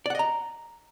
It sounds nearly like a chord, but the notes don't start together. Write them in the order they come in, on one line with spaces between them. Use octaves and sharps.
D5 F#5 D#5 A#5